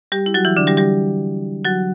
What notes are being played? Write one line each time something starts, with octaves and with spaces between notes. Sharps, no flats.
G3 G4
E4
F#3 F#4
E3 E4
D3 D4
G3 G4
G3 G4
F#3 F#4